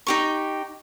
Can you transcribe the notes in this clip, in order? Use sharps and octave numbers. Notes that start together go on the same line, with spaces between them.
D#4 G4 C#6